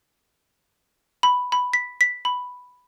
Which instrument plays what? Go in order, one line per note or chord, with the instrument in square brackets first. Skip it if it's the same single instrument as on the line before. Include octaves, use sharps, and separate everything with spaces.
[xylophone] B5
B5
B6
B6
B5